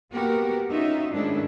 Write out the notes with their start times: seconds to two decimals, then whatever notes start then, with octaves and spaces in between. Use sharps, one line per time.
0.13 A#3 B3 F#4 G4 A#4
0.70 C#4 D#4 F4 F#4 E5
1.13 G#2 D#3 A3 C#4 D4 E4